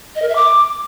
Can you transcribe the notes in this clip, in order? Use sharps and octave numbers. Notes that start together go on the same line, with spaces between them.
D#5
A#4
E5
D6